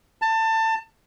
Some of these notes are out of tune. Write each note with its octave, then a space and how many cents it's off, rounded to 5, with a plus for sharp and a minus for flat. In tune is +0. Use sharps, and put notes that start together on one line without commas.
A5 +25